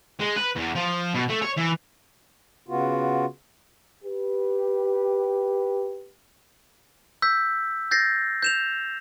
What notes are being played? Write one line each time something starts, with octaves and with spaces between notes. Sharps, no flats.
G#3
B4
E2
F3
B2
A3
C#5
E3
C#3 B3 F4 F#4
G4 B4
E6 G6 B6
G6 A6 A#6 C7
G6 E7 F7